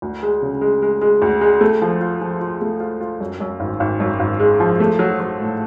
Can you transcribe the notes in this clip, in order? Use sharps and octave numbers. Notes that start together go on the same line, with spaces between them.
D2
G#3
C#3
G#3
G#3
G#3
D2
G#3
A3
F3
F4
F3
F4
A3
F4
F4
F#2
F#2
G#1
G#1
F#2
G#1
G#3
F3
A3
F#3
F#3
A2